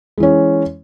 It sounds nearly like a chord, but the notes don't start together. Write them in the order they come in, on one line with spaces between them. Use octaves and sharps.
G#3 E3 C#4